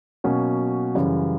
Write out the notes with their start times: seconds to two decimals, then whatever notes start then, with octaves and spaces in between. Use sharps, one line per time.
0.24 B2 F#3 A#3 C#4
0.95 F#2 C#3 E3 G3